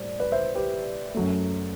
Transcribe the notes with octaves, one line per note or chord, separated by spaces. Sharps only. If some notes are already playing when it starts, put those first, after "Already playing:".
Already playing: A2 G3 C5 D5
B4 D5
C5 E5
G4 B4
F#2 F#3 A3